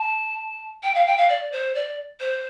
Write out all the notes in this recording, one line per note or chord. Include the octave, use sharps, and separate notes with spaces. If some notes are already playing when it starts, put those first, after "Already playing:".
Already playing: A5
G5
F5
G5
F5
D5
C5
D5
C5